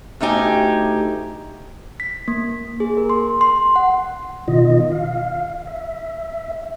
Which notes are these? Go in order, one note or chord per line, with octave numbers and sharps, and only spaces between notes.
D2 A3 D#4 G4 G#5
B6
A#3
G#4
A#4
C6
C6
F#5
B2 D#3 F4 D#5
F5
E5